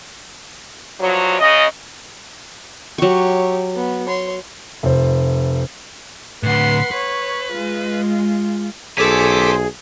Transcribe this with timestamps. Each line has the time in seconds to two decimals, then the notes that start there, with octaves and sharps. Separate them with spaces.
0.99 G2 F3 F#3
1.39 C#3 D#5
2.98 F#3 G4 C#5 C#6
3.75 B3
4.06 C#5 C6
4.83 F1 C5
6.43 A2 D3 B4 F#5 C6
6.91 B4 C#5
7.52 G#3 F4
8.98 B1 C#4 G#4 A4 C5 D6 B6